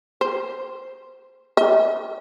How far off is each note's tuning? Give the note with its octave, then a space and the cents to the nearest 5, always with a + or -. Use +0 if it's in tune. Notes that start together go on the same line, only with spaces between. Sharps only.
C5 -5
E5 -45